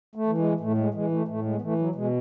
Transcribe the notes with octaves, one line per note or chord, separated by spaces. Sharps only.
A3
E3
G#3
A2 A3
G#3
E3 G#3
A3
A2 A3
G#3
B3
E3 A3
F#3
B2 G#3